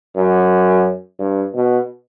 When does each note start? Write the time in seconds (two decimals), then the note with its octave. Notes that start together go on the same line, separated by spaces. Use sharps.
0.16 F#2
1.19 G2
1.54 B2